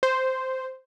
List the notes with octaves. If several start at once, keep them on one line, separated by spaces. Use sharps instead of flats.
C5